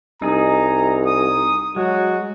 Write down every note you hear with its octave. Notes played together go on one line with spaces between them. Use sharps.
C2 D#4 G#4 A#5
D#6
F#3 G#3 F#4